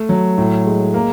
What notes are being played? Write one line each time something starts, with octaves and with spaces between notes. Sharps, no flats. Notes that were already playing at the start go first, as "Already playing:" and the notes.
Already playing: A3
F#3
A2
G#3
A#3